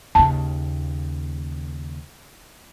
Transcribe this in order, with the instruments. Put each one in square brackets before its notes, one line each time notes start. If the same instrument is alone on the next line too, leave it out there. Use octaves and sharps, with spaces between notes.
[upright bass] D#2 C#3 [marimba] A5